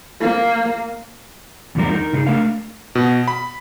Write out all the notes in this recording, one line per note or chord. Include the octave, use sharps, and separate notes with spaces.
A#3
E2 A2 D3 F3 G3 A#4
D#4 A#4
C#3 F#3 D#4 G#4
A3 D4 A#4 F5
B2
B5